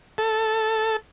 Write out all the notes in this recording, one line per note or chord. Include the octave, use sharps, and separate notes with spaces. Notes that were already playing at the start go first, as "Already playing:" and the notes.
A4